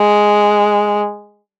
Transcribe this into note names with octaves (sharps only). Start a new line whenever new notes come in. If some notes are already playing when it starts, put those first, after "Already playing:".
Already playing: G#3